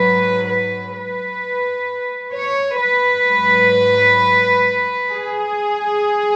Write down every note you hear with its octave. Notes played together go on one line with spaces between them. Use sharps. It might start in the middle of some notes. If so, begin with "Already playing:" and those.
Already playing: G#2 F#3 B4
B4
B4
C#5
B4
G#2 F#3
G#4